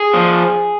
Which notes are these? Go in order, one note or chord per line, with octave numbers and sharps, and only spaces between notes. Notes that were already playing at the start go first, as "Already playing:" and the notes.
Already playing: G#4
F3